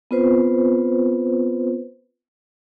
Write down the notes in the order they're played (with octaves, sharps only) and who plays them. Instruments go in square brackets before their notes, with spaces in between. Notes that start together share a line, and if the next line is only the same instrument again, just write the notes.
[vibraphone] B3 C4 F4 B4 C5